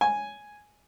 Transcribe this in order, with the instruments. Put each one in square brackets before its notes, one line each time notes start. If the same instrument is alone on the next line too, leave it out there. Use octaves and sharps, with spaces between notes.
[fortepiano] G#5